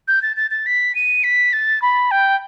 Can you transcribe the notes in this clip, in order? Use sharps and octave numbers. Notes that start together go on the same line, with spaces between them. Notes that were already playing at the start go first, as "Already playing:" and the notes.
G6
A6
A6
A6
B6
D#7
B6
A6
B5
G5